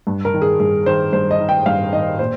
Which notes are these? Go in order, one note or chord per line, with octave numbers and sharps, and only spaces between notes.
G2
A#4
D#3
G#4
G2 G#4
D#3 C5
G2 C5
D#5
D#3
G5
G2 F5
D#3 D#5
A#2 C5